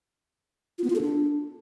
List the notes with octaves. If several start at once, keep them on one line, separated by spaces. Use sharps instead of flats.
F4
B3
F4
A4
D4